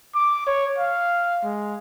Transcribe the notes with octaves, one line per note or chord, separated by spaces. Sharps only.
D6
C#5
F5
G#3